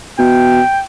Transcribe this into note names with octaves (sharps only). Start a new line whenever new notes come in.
B2 G5